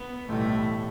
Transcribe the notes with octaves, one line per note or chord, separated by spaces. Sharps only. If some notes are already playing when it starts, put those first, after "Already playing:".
Already playing: B3
B1 A2 E3 G3 A3